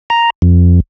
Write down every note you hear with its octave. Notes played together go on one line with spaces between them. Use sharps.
A#5
F2